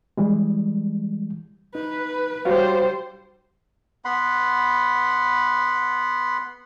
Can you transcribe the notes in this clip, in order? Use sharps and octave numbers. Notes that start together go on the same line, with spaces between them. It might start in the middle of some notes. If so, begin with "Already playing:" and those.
E3 G3 G#3
D#4 B4
G3 F#4 C5 C#5 F5
B3 F#5 B5 C6